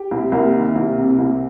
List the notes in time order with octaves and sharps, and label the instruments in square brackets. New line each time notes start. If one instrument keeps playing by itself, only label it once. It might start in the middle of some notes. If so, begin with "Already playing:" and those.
Already playing: [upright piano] G4
C2
C2 A#3 A#4
D#3
C2
C3
C2